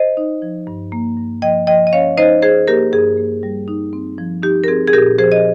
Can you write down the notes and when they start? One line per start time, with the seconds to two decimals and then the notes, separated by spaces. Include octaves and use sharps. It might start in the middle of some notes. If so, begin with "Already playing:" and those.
Already playing: C5 D#5
0.17 D#4
0.42 F3
0.67 G2
0.92 A#3
1.17 G2
1.42 F3 D#5 G5
1.67 F3 D#5 G5
1.87 D#5
1.93 C#4 C#5 F5
2.17 D#4 C5 D#5
2.42 D#4 G#4 C5
2.68 A#3 G4 A#4
2.93 G2 G#4
3.18 A#3
3.43 G3
3.68 D#4
3.93 C4
4.18 F3
4.43 D#4 G4
4.64 A#4
4.68 C4 G#4
4.87 G#4
4.93 A#2 G4 A#4
5.18 F3 G#4 C5
5.32 D#5